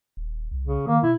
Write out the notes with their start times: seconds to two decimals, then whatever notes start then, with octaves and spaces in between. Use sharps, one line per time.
0.17 D#1
0.51 C2
0.65 C#3
0.87 D#3 A#3
1.03 B2 E4